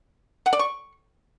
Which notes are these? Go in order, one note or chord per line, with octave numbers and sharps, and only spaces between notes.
F#5
D5
C#6